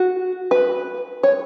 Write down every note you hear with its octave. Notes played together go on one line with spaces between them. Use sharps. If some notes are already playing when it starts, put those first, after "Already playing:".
Already playing: F#4
B4
C#5